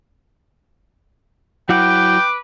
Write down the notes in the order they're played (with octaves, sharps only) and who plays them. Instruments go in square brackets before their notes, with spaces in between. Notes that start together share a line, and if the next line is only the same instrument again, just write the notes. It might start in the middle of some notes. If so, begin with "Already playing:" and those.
[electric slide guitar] F#3 E4 F#5 [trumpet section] B4 D6 [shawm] G5